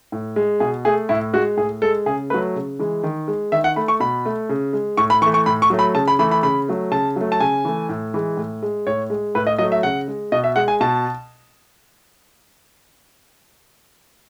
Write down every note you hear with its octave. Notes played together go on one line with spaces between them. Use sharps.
A2
G#3
B2 G#4
A3 G#4
A2 E4
G#3 F#4
A2 G#4
G#3 A4
C#3 G#4
F#3 A3 B4
C#3
E3 G#3
D#3
G#3
D#3 E5
F#5
A3 B5
C#6
B2 B5
A3
C#3
G#3
A2 C#6
B5
E3 A3 C#6
C#6
A2 B5
C#6
F#3 A3
B5
C#3 A5
B5
E3 A3 B5
B5
C#3 B5
F#3 A3
C#3 A5
F#3 A3
A5
C#3 G#5
E3 A3
A2
E3 G#3
A2
G#3
A2 C#5
G#3
A2 B4
D#5
F#3 A3 D#5
E5
C#3 F#5
G#3
B2 D#5
E5
G#3 F#5
G#5
B2 A5